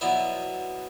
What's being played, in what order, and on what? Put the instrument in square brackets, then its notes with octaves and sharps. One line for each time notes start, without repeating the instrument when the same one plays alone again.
[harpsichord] B2 F#3 B3 E4 D5